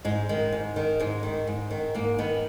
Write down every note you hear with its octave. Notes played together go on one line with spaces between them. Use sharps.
G#2 G#3
D#3 G#3
G#2
D#3
G#2 G#3
D#3
G#2
D#3
G#2 A#3
D#3 B3